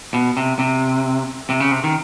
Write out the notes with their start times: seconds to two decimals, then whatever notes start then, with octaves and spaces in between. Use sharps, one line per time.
0.14 B2
0.37 C3
0.59 C3
1.50 C3
1.60 C#3
1.71 C3
1.84 D#3